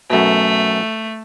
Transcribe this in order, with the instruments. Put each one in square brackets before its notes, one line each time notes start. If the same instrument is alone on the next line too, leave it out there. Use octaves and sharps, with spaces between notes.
[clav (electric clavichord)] F#2 B2 [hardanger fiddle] A3